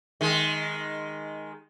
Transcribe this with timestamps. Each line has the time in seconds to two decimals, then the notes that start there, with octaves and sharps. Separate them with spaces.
0.21 D#3 G#3